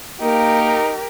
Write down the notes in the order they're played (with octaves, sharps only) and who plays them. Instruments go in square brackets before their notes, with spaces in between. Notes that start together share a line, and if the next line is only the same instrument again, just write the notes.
[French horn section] A#3 [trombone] D#4 [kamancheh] G4 A#4